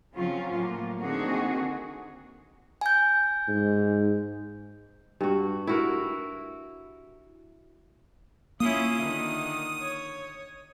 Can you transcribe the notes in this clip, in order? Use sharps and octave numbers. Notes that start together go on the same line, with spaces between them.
C#3 F3 F#3 C4 C#4 F4
A2 F#3 A#3 F4
D3 D#3 A#3 C4 F#4 G#4
G#5 G6
G#2
G2 F#4
E4 F#4 A#4
A#3 C#4 E4 F4 D#6
D3 D#3
C#5